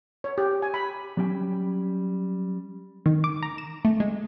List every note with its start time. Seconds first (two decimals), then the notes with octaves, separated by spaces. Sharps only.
0.24 C#5
0.38 G4
0.62 G#5
0.74 B5
1.17 F#3 G3 C#4 G5 G#5
3.06 D#3
3.24 D6
3.43 A#5
3.58 E7
3.85 A3
4.00 G#3